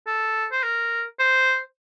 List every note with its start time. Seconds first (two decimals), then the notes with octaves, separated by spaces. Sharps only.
0.07 A4
0.52 C5
0.63 A#4
1.19 C5